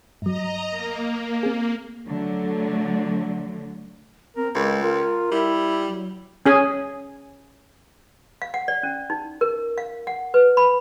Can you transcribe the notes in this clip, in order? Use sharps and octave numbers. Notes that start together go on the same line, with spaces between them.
G2 F#3 D#5 A#5
A#3
C4 G#4
D3 F#3 A3
C4 A#4
C#2 G#3 A#4
F4 A#4
G3 E4
F#3
C#4 G#4 G#5
F5
F#5
D5
C#4
D#4
A#4
F5
F#5
B4
B5